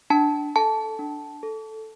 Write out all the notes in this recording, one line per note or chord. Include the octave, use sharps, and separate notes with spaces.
D4 A5
A4 A5
D4
A4